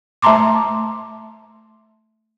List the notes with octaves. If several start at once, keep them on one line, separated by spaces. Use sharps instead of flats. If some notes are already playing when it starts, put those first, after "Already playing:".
A3 E5 A5 A#5 C6 D6